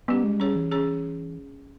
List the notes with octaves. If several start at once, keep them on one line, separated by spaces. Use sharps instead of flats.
G3 B3 C#4 G4
G#3
G3 C#4 G#4 C#5
E3
C#4 G#4 C#5